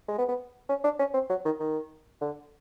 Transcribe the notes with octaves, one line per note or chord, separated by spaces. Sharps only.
G#3
B3
B3
C#4
D4
C#4
C4
F#3
D#3
D#3
D3